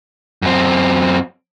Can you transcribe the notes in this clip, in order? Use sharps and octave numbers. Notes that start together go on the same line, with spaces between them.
F#2 C4